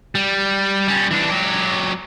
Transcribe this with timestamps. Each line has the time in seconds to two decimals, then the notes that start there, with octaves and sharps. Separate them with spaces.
0.15 G3
0.88 G3 C#4
1.11 E3 D4
1.30 F#3 G4